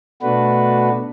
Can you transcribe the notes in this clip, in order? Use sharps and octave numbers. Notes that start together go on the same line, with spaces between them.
B2 A3 D4 F#4 B4